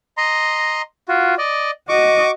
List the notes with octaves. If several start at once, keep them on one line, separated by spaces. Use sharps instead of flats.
D#5 A#5 C6
F4 F#4
D5 D#5
F#4 D#5 C#6 D6